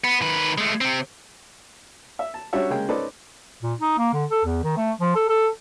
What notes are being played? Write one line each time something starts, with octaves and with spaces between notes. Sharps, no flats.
B3
D#3 B4
G#3 A3
C3 C4
E5
A5
G3 C#4 D4 F#4 C#5 E5
C#3 G#3 A#3 G5
C#4 D#4 A4 B4 C5 D5
A#2
D#4
A#3
D3
A4
E2
D#3
A3
F3
A4
A4